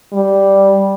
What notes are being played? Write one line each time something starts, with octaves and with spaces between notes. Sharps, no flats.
G3